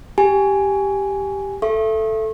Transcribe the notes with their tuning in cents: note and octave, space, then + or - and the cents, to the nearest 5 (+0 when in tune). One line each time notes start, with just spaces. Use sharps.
G4 +0 G#5 +0
A4 +0 E5 +25 C#6 -40